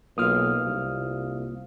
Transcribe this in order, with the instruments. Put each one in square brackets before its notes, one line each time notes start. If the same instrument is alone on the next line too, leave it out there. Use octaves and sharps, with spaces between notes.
[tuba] B1 [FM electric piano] A#3 F4 F5 [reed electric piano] D#6 F6
[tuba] C2